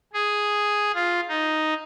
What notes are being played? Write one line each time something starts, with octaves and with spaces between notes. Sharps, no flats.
G#4
F4
D#4